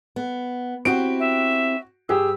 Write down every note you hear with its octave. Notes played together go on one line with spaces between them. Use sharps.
B3
C4 E4 F#4 G4 D7
E5
G2 G4 G#4 E6